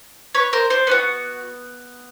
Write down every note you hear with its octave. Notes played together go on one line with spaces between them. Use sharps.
B4 C#5
A#4 C5
C5 D5
B3 D#4 F#4